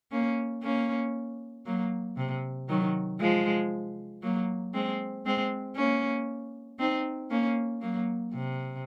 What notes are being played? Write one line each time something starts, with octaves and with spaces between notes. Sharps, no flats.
A#3 C#4
A#3 C#4
F#3 A#3
C3
D#3 F#3
F3 G#3
F#3 A#3
G#3 C4
G#3 C4
A#3 C#4
C4 D#4
A#3 C#4
F#3 A#3
C3